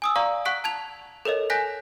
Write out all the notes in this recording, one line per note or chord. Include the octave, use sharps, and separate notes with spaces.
G#5 D#6 E6
D5 F5 A#5 C#6
F#5 C#6 F#6 B6 D7
A5 G#6 F7
A4 A#4 C#5 D#5
G#5 F#6 G6 A#6 B6